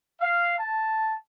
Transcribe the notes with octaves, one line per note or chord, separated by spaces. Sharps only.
F5
A5